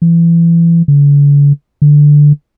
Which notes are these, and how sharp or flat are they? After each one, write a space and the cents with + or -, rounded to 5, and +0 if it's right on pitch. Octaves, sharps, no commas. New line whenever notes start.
E3 +30
D3 -45
D3 +0